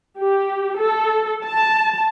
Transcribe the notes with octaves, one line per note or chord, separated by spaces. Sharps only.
G4
A4
A5